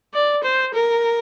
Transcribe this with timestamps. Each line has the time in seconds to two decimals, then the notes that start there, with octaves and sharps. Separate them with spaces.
0.13 D5
0.43 C5
0.74 A#4